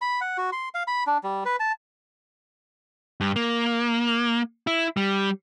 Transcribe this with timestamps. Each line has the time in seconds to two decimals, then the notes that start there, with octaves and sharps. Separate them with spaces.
0.01 B5
0.21 F#5
0.38 F#4
0.52 C6
0.74 F5
0.88 B5
1.07 D4
1.24 G3
1.45 B4
1.60 A5
3.21 G2
3.36 A#3
4.67 E4
4.97 G3